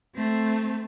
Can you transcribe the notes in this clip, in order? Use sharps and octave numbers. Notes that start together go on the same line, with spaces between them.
A3 C4